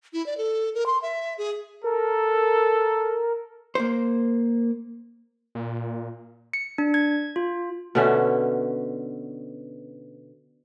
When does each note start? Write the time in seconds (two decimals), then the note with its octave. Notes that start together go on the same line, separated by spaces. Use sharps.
0.13 E4
0.26 D5
0.38 A4
0.75 A#4
0.86 C6
1.02 E5
1.38 G#4
1.84 A4 A#4
3.75 A#3 C5
5.55 A#2
6.53 C#7
6.78 D4
6.94 G#6
7.36 F4
7.95 B2 D3 C#4 E5